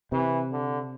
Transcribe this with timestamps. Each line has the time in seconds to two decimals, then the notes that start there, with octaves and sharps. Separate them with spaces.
0.12 C3 E3
0.52 D3